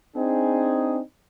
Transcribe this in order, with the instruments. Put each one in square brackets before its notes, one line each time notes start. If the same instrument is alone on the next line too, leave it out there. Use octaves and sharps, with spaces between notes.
[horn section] C4 D4 D#4 G#4